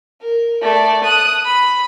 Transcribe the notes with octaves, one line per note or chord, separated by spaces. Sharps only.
A#4
A3 D5
D#6 F#6
B5